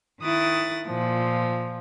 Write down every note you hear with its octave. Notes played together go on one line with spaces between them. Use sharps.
D#3 E4 D#6 F#6 A6
A#2 F3